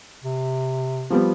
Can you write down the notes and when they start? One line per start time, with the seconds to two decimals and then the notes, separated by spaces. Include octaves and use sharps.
0.24 C3
1.10 F3 G3 B3